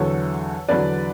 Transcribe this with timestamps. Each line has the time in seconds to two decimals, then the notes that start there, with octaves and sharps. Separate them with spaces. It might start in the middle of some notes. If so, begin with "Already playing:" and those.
Already playing: E2 D3 F#3 A4 C#5
0.69 E2 D3 F#3 B4 D5